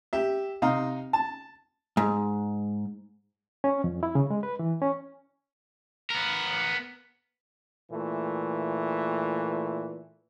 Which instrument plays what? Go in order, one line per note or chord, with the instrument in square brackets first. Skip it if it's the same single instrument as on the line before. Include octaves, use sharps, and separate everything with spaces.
[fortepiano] G4 E5
C3 D#4 F5 A#5
A5
[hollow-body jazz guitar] G#2
[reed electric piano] C#4
F2
E4
C#3
G#3
B4
E3
C#4
[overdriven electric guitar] B3 A#4
[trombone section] A#2 E3 A3